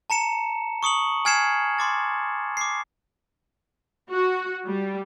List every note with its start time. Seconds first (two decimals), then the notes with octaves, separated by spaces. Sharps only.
0.10 A5 A#5 C#7 E7
0.83 C#6 D#6 C#7 F#7
1.25 G#5 F6 G#6 C7 C#7 E7
1.79 C6 D6 A6
2.57 D6 C7
4.10 F#4
4.66 G3